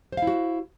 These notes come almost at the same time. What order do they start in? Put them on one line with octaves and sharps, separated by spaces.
C5 F5 E4 F#4